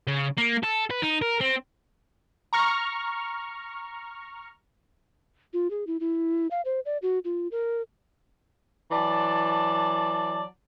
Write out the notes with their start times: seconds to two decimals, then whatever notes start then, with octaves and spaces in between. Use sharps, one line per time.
0.07 C#3
0.38 A#3
0.63 A4
0.91 B4
1.02 D#4
1.22 A#4
1.41 C4
2.53 A#5 C#6 F6
5.53 F4
5.70 G#4
5.87 E4
6.00 E4
6.51 F5
6.65 C5
6.86 D5
7.02 F#4
7.25 F4
7.52 A#4
8.92 E3 F#3 D5 A5